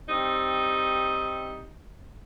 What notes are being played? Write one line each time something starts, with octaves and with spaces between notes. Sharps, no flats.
G3 C4 D#4